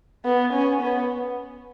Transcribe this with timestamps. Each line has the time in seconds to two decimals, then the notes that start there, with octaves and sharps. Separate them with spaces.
0.25 B3
0.53 C#4
0.81 B3